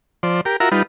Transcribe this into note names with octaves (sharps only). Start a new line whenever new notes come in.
F3 C5 D5
G4 A#4
F4 F#4 A#4 E5 A#5
G3 D#4 F4 B4